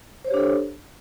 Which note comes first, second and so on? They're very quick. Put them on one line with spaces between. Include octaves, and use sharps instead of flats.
C5 C#5 G4 D4 A4